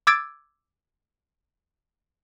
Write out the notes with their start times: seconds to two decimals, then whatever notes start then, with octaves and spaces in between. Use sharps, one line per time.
0.07 D6 E6 G#6 A6 D7